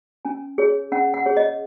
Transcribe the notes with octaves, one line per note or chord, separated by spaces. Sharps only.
C#4 G#5
G#4 C#5
C#4 F#5
F#5
G#4 C#5
D#5